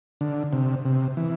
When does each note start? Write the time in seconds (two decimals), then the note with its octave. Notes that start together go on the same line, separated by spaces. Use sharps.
0.21 D3
0.53 C3
0.85 C3
1.17 E3